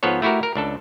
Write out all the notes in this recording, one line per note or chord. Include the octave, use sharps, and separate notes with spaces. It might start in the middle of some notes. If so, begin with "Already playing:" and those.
G#2 F3 B3 A4 C#5
A3 E4 F#4 G4 A#4
A#4
C#2 D4 A4